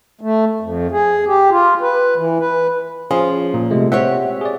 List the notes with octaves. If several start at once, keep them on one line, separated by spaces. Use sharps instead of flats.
A3
F2
G#4
G4
F4
B4
E3
B4
F3 C#4 F4 G#4
A#2
C3 G#3 A3
C4 G4 C#5 E5 F#5
G#4 D5